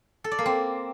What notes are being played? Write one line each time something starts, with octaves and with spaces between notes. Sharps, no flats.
A4
D5
A#3
C4